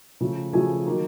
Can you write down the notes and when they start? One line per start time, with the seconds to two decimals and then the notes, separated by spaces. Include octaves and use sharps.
0.20 C#3 F3 A3
0.53 C#3 F3 A3 G#4 G#5
0.86 D#3 F#3 A#3